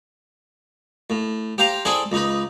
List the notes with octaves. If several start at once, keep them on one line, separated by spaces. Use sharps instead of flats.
A2
G4 C5 F5 G5 A#5
C4 E4 G#4 A4 D5 G#5
C#2 D#4 B4